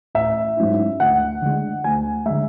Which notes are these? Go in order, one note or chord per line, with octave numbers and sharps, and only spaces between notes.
A1 E5
G#2 F#3 C#4 E4
D2 F#5
D3 G#3
D2 G#5
D3 G#3 E5